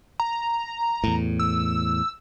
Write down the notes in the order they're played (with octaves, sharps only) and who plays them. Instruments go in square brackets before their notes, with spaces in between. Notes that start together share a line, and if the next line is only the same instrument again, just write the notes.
[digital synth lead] A#5
[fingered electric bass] E2 A2
[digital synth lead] E6